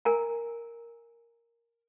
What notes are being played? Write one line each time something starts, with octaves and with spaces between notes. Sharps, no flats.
A#4 G#5 A#5